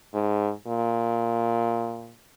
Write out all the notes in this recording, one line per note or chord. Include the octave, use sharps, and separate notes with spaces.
G#2
A#2